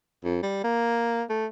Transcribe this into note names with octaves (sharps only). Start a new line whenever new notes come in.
F2
G3
A#3
A3